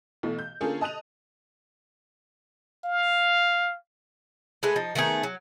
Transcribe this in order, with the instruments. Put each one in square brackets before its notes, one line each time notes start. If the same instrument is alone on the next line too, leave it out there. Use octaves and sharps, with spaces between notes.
[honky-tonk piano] B1 B2 E3 A3
G6
D3 A#3 C#4 F4 G#4 A4
D#5 A5 D#6 F#6 D#7 F7
[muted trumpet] F5
[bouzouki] G#3 A3 B4
F3 D#4
D#3 A3 B3 G#4
F#3